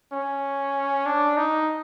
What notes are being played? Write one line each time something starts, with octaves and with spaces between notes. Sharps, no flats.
C#4
D4
D#4